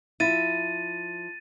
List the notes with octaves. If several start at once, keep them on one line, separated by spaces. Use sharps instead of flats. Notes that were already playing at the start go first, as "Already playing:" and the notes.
F3 E4 A6 D#7